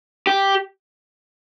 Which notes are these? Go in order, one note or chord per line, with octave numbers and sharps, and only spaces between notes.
G4